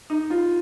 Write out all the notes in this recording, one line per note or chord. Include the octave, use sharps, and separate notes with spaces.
D#4
F4